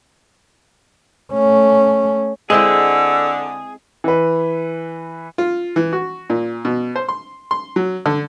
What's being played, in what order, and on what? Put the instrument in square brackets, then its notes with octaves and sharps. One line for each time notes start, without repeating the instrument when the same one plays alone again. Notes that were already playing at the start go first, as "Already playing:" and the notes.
[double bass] A3 C#4
[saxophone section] D3 [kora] G#3 C4 E4 [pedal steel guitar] G#4 [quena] E6
[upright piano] E3 B4
[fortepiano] F4
E3
F#4
A#2
B2
C5
C6
C6
F#3
D3